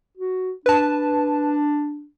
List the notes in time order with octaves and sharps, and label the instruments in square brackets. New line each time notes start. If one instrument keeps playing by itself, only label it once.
[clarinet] F#4
[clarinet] D4 [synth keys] B4 A5